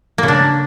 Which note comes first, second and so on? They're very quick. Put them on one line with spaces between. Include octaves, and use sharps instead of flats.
A#3 C#3 D4